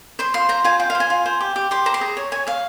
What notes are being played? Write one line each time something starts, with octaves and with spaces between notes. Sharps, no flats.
C5 C6
F4 C6
C5 A#5
F4 G#5
F4 G5
F5
C5
G#5
F4
C5
G4
G4
G4 C6
C5 A#5
C6
G#4 A#5
C#5
C#5 G#5
C#5 F5